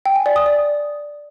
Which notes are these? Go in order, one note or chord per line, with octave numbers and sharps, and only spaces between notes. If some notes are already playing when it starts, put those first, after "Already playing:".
G5
G#5
D5
D#6
D5